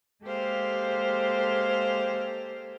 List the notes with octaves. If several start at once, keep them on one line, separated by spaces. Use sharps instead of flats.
G#3 A#3 G4 A4 C5 F5